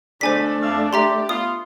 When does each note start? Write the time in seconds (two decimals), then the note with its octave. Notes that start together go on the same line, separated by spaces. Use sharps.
0.21 B2 D3 A3 D4 C5 G#5 B6
0.63 F2 E5 F5
0.93 G4 E5 A#5 C6
1.29 B3 F4 D#6